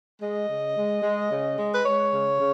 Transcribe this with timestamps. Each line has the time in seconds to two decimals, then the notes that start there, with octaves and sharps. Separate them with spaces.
0.22 G#3 D#5
0.48 C#3
0.76 G#3
1.03 G#3
1.31 C#3
1.58 G#3
1.74 B4
1.84 G#3 C#5
2.12 C#3
2.38 C#3